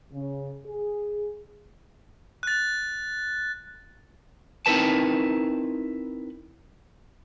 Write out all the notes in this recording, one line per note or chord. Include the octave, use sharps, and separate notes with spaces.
C#3
G#4
F#6 A6
C4 D#4 E4 A#4 B4 A5